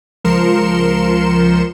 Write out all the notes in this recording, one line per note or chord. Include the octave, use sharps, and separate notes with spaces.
C#2 F3 A#4 C6 C#7 E7